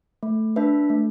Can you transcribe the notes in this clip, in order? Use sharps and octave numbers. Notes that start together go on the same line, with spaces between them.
A3
D4 B4 E5
A3